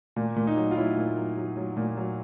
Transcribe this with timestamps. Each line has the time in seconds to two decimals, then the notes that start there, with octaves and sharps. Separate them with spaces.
0.16 A#2
0.36 A#2
0.47 D#4
0.57 F#3
0.71 F4
0.76 F#3 E4
0.96 A#2
1.18 F#3
1.37 F#3
1.57 F#3
1.77 A#2
1.97 F#3